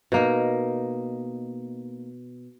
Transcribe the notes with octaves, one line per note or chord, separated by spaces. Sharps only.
B2 A#3 D#4